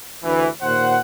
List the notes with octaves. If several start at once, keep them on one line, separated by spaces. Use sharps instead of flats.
D2 E3
D#2 A#2 C5 F#5